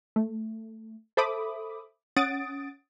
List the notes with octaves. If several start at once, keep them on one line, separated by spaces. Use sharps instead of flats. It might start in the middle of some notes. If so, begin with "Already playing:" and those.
A3
A4 C5 E5 B5 D6 D#6
C#4 F#5 D#6 A6 D7